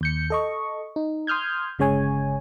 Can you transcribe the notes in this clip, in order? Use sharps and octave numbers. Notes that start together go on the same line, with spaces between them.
D#2 G6 C#7
A4 D#5 C#6
D#4
C6 D#6 F6 G6 G#6
G1 C#3 G#3 C#5 G#5